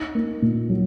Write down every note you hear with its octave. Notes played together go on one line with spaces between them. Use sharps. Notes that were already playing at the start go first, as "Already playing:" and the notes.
Already playing: D#4
A#3
A#2
F#3